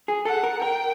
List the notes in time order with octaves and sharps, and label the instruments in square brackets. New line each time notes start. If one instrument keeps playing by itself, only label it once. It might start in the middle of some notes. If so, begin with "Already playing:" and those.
[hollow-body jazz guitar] G#4
[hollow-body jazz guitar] A4 [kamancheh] F#5
[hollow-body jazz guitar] A#4
[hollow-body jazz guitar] A#4 [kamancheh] G5